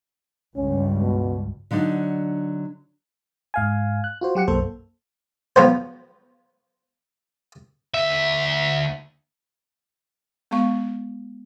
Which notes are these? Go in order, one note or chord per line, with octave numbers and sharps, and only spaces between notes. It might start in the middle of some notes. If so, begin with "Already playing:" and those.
C#2 G2 C#4
B2
D3 F#3 D4 D#4
G#2 F5 G#5
F#6
F4 F#4 C5
F#3 G4 F#5 C#7
B1 F#2 A#3 A4 C5
F3 F#3 B3 C5
D2 E5
G#3 B3 F5 C#6